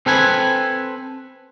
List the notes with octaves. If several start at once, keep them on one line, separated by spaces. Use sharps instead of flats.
C4 A4 B4 G#5